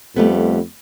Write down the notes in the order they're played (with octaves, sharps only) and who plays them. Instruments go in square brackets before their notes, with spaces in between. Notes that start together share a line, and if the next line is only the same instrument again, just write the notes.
[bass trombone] F2 [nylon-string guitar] G3 A3 B3